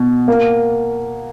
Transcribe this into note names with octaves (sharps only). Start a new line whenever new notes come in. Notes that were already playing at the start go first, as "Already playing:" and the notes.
Already playing: B2
A#3